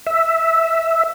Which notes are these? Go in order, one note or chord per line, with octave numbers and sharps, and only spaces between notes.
E5